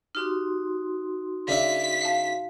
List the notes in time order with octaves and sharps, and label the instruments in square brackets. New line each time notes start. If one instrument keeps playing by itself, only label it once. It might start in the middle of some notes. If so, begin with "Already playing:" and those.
[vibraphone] D#4 F#4 C6 [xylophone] G4 F6
[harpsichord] C#3 D4 E5 [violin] B6
[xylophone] F5 A5